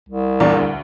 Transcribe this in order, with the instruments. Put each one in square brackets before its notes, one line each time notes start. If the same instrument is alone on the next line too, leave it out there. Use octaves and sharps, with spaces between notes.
[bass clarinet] C2
[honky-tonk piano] E2 A#2 D4
D2